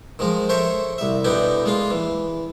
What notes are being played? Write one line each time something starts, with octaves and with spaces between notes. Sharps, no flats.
D#3 F3 G#3 A#4
A4 A#4 C5 C#5 E5
C2 E5
B2 D3 B3 D#4 E4 G4
G#3 A#3 F4 F5
E3